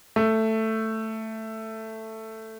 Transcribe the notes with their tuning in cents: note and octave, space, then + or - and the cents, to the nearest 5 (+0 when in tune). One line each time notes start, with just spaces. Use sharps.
A3 +5